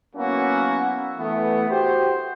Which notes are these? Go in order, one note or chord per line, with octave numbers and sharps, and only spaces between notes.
F#3 A#3 B3 C#4 E4 F#4
E3 A3 B3
F#4 G4 C5